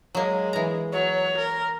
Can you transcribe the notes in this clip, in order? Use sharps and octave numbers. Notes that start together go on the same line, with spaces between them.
F#3 G#3 A#3
E3 A#5
F#3 C#5
A#4